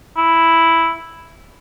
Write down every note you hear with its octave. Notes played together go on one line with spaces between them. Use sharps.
E4